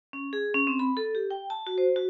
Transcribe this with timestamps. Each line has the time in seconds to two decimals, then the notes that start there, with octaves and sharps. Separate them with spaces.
0.13 C#4
0.33 G#4
0.54 C#4
0.67 C4
0.79 B5
0.97 A4
1.15 G4
1.31 G5
1.50 A5
1.67 F#4
1.78 C5
1.96 F#4